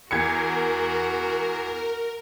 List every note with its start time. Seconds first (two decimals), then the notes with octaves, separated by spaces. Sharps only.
0.11 E2 F#4 A#4 G#6 C#7